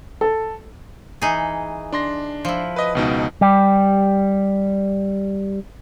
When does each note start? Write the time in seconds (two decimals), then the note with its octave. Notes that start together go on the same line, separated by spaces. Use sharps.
0.21 A4
1.22 E3 D#4 G#4
1.93 D4 C6 A#6
2.45 F3 E4
2.76 B4 D#5
2.95 C#2 B2 D#4
3.41 G3 G4